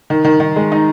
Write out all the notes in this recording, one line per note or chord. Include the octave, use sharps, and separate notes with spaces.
D#3
D#3
D#3
G#3
D#4